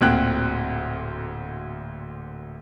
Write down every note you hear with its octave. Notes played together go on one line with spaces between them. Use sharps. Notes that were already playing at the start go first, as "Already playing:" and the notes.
D1 D2 A#2 C4 G5 F#6